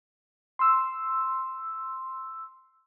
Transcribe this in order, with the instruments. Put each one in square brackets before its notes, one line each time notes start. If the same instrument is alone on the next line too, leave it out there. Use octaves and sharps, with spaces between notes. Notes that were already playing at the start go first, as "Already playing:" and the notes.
[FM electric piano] C6 E6